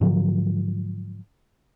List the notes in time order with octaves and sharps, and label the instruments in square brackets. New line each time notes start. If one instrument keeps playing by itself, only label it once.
[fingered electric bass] G#2 D3 F3 F#3